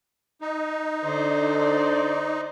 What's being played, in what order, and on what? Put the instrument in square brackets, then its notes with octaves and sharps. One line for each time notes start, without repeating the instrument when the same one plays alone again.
[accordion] D#4
[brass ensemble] D3 [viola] C5 D5